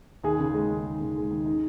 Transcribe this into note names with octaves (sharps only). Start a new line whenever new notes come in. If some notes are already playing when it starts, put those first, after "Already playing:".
D#2 G#4
C#3
G#3
D#2
D#2
C#3
G#3
D#2
D#4